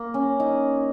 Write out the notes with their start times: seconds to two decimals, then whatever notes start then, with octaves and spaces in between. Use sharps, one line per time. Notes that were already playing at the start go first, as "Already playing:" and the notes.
Already playing: A#3
0.14 C#4
0.40 D#4